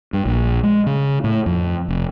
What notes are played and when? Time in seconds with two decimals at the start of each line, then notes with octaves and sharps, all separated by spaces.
0.13 G2
0.25 A#1
0.63 G#3
0.86 C#3
1.24 A2
1.46 F2
1.88 F1